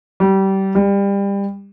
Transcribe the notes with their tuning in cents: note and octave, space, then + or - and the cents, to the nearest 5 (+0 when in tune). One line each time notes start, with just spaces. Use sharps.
G3 -25
G3 +25